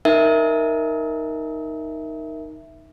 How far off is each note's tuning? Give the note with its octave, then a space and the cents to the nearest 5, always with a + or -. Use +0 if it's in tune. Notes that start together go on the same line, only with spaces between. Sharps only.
D#4 +0 A#4 +0 E5 +0